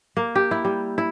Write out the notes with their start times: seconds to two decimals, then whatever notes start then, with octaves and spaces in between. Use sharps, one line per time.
0.17 A#3
0.35 G4
0.51 E4
0.65 G3
0.98 E4